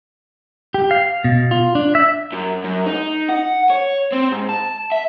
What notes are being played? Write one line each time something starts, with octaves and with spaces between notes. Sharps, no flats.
G4
F5
B2
F4
D4
E5
F#2
F#2
D#4
F#5
C#5
C4
G#2
A5
E5